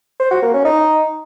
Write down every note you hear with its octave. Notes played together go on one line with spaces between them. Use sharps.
C5
F#4
A#3
C#4
D#4